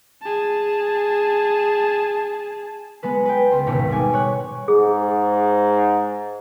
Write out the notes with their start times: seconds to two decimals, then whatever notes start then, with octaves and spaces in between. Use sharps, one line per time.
0.22 G#4 A5
3.03 G#3 B3 B4
3.25 B4 G5
3.51 C#2 C5 C6
3.67 G#1 D#2 G#2 B2 B6 C#7
3.89 B2 G3 G#3 G#5 D6 C#7
4.13 C#5 F#6
4.68 G#2 G#4